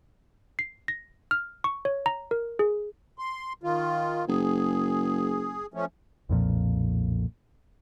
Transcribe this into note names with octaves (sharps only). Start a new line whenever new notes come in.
C7
A#6
F6
C#6
C#5
A#5
A#4
G#4
C6
D#3 F4
F#1 G#4
F3 A3 C#4
B1 F2 A#2 F3